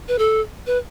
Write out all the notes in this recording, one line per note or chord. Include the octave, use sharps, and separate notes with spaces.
B4
A4
B4